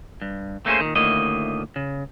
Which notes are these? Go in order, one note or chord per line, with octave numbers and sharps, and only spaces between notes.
G2
A3 A#3 C#4 E4 G#4 C5
A#2 D#3
D2 A2 D#3 A#3 D#5
C#3